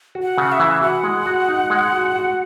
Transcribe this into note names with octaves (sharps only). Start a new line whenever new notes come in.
F#4
F#5
C#3
E5
E3
F#4 F#5
G#3
F#4
D#4
G#3
F#4
F#4